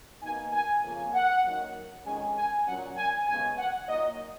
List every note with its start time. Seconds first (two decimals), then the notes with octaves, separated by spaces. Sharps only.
0.22 B2 A#3 D#4 G#5
0.53 G#5
0.83 F2 C#3 F3 A#3 C#4 G#5
1.13 F#5
1.44 F#2 D#3 F#3 A#3
2.05 F2 D#3 G#3 C#4 G#5
2.36 G#5
2.66 A#2 F#3 C#4 F#5
2.97 G#5
3.27 D#2 C#3 G#3 B3 G#5
3.58 F#5
3.88 A#2 F#3 A#3 D#4 D#5